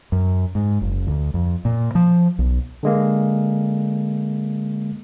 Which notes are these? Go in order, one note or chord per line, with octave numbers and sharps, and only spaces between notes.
F#2
G#2
F#1
D2
F2
A#2
F3
B1
D3 G#3 A#3